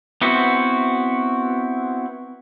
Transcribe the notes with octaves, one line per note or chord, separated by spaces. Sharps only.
B3 C4 E4 F#4